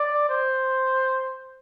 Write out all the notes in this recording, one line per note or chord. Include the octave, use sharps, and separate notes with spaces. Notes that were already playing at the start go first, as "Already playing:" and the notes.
Already playing: D5
C5